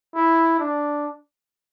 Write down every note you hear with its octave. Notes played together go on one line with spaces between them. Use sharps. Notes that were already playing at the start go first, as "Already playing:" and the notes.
E4
D4